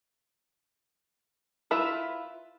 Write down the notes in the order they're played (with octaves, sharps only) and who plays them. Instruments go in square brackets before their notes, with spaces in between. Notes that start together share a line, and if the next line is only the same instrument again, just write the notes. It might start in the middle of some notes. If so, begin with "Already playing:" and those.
[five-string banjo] E4 F4 B4 E5